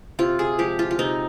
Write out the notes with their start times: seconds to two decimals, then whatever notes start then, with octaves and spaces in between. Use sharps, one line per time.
0.19 C3 F4
0.39 G#4
0.59 F3 G#3 G4
0.79 F4
0.91 F4
0.99 C3 D#4